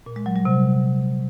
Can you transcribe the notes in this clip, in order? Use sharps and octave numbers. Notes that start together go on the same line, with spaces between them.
A#2
G#3
F#3
G3
C3